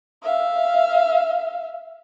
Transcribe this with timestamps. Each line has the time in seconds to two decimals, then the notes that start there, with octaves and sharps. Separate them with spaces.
0.23 E5 F5